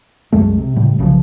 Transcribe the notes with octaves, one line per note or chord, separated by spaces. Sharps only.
C2 F#2 G#3 A3
C3
A2 C#3 G3
B1 C#3 E3 F3